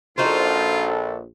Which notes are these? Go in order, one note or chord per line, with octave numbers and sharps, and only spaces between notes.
A#1 D#4 F4 F#4 A4 C5